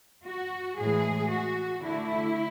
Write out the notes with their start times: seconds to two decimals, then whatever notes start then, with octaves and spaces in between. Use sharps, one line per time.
0.25 F#4
0.77 A2 E3 G#3 G#4
1.30 F#4
1.82 D3 A3 E4